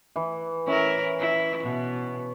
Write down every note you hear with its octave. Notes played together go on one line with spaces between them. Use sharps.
E3
C#4 E4 A#4
E4
B2